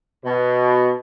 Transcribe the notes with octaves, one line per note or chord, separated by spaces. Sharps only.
B2